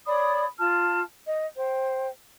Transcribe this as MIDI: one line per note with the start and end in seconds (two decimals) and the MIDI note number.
0.06 0.44 73
0.06 0.44 74
0.06 0.44 83
0.06 0.44 87
0.58 0.99 65
0.58 0.99 81
0.58 0.99 89
1.26 1.45 75
1.57 2.08 72
1.57 2.08 79